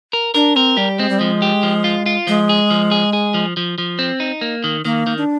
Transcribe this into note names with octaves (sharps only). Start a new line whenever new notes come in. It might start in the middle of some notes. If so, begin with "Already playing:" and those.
A#4
D4 A#4
C4 A#4
G3 G4
G#3 C4
G3
F3 G#3
G4
F3
F4
F4
F3 G#3
G#4
F3
G#4
G#4
F3
F3
F3
C4
D#4
A#3
D#3
D#3 A#3
D#3
D4